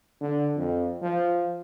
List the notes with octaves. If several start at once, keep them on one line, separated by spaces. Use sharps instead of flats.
D3
F2
F3